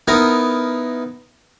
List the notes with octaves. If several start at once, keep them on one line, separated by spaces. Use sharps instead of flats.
B3 D#4 E4 A#4